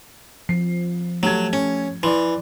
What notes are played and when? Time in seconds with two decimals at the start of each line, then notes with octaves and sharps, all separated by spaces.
0.49 F3 C7
1.23 F#3 A3 G4 G#6
1.53 C#4
2.03 E3 D5 C6